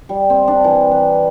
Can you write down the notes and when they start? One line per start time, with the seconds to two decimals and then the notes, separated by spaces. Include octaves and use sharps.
0.09 G3
0.30 C4
0.48 D4
0.64 E3
0.91 B4